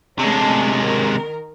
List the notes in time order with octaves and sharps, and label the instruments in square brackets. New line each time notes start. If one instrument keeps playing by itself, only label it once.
[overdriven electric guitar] C3 G#3 [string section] A3 C#4 D4
[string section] D#3 A#4